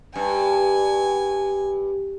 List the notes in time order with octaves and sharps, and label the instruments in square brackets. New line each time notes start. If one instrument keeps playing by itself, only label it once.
[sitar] G2 [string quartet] G#5